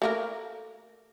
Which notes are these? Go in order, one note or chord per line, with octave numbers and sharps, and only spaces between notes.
A3 A#3 A#4